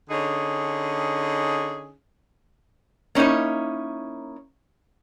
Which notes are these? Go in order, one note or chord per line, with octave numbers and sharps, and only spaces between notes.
D3 C#4 D#4 G#4
A#3 C#4 D#4 E4 C#5